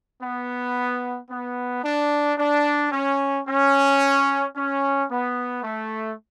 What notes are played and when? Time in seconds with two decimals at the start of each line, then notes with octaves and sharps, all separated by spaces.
0.21 B3
1.30 B3
1.84 D4
2.38 D4
2.92 C#4
3.48 C#4
4.56 C#4
5.11 B3
5.64 A3